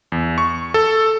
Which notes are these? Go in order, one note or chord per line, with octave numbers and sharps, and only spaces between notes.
E2
C#6
A4